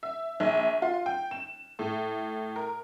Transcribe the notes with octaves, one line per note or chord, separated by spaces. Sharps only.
E5
A#1
F4
G5
E7
A2
A#4